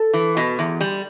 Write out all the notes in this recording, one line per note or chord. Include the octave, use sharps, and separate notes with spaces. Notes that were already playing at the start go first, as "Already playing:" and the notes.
Already playing: A4
E3
B2
E2
G3